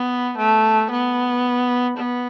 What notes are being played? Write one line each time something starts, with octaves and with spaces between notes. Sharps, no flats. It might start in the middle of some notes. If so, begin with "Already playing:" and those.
Already playing: B3
A3
B3
B3